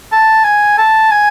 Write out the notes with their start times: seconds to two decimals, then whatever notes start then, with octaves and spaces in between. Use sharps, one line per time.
0.12 A5
0.44 G#5
0.78 A5
1.11 G#5